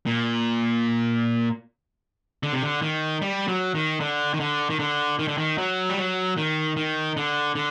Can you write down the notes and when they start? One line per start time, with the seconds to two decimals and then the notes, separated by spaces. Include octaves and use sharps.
0.06 A#2
2.43 D3
2.53 C3
2.62 D3
2.82 D#3
3.22 G3
3.48 F#3
3.75 D#3
4.00 D3
4.34 D#3
4.40 D3
4.70 D#3
4.79 D3
5.19 D#3
5.28 D3
5.38 D#3
5.58 F#3
5.90 G3
5.97 F#3
6.37 D#3
6.76 D#3
7.16 D3
7.55 D3